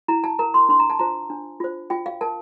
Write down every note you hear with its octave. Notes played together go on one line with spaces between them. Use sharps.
E4 A#5
A5
A#4 A#5
C6
D4 C6
A#5
A5
F4 C5 A#5
D4
F4 C5
F4 G5
F5
A#4 A5